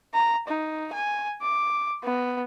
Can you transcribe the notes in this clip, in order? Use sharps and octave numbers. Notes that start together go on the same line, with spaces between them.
A#5
D#4
G#5
D6
B3